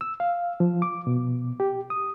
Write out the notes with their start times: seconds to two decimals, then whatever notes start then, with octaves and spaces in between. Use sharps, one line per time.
0.01 E6
0.20 F5
0.60 F3
0.82 D6
1.07 B2
1.60 G4
1.90 D#6